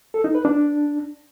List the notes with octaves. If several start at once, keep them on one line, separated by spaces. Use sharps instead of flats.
A4
D#4
B4
D4